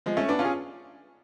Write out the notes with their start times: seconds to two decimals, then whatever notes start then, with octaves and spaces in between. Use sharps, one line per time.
0.06 F3 G#3
0.17 A3 C#4
0.28 B3 D4
0.39 C#4 F4
0.45 G#4